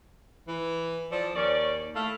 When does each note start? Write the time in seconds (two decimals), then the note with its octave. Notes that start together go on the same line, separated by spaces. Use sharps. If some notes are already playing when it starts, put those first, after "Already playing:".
0.48 E3
1.11 F3 A4 D5
1.35 D#2 C#4 D5
1.95 A3 E4 F5